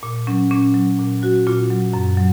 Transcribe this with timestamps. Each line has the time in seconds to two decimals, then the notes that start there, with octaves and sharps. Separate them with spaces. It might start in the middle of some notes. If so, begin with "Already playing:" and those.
0.03 A#2
0.27 F#3 C#4
0.51 A#2 C#4
0.74 F#3
0.99 A#2
1.22 F#3 F#4
1.47 A#2 F4
1.70 F#3
1.93 F#2
2.17 F#3